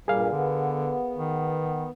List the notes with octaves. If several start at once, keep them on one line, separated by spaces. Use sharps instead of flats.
G2 A#2 G3 G#4 A#4 F5
D3 B3
D#3